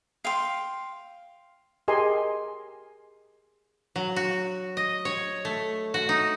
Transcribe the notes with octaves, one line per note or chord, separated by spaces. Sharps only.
F5 G5 C6
G4 G#4 A#4 D#5 G#5 C6
F#3
F#4
D#5
C#5
A3
F#4
D#4